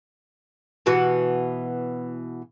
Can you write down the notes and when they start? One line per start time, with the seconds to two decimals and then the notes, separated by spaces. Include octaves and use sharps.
0.86 B2 E3 F#4